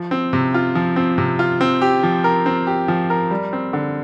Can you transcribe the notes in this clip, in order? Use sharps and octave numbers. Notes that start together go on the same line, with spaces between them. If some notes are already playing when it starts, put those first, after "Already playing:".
Already playing: F3
C4
C3
F4
F3
C4
C3
F4
C4
G4
F3
A#4
C4
G4
F3
A#4
G3
C4
D3